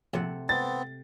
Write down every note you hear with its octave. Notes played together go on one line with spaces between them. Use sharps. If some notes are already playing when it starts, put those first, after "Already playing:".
A#1 C3 A3 F#5
B3 C4 A6